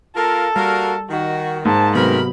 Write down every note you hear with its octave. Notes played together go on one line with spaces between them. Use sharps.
A#3 F4 A4 A#4
G3 A#3 F#4 A#4
D#3 F#4
G#2 A#3 C5 A5
C3 F#3 A3 B3 C4 A#4 B5